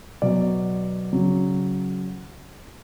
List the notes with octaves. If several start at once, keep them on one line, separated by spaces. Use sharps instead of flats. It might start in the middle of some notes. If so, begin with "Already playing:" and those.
B2 F#3 D5
C#3 F#3